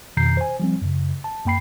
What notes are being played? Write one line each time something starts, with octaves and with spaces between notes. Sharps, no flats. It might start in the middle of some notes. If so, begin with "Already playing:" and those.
F2 B2 D#3 A#5 G6 C7
C5 G#5
F3 G3 C4
F#2 C#3
A5
F#2 A#3 G5 B5 C7